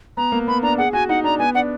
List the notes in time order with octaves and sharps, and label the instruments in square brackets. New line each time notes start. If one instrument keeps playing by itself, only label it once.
[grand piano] B3 [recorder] A#5
[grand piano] A#3
[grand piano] B3 [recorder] B5
[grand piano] D4 [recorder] A#5
[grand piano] G#4 [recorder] F#5
[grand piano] F#4 [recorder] G#5
[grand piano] D#4 [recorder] F#5
[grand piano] D4 [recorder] A#5
[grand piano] B3 [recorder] G#5
[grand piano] D4 [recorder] F#5